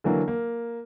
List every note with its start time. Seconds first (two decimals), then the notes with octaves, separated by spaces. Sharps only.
0.04 D3 E3 F#3 A#3
0.28 A#3